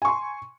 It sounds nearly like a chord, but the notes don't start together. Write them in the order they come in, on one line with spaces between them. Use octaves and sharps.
G#5 C#6 C6